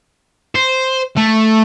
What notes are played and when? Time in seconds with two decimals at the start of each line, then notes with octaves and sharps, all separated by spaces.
0.55 C5
1.17 A3